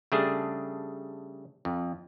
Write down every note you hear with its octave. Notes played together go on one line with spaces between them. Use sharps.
C#3 G3 A3 D4 G#4
F2